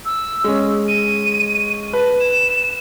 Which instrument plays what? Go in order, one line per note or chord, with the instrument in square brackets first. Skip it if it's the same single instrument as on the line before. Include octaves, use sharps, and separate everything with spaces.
[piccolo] E6
[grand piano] G#3 C#4
[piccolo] D#7
[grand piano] B4 [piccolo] A5
[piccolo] E7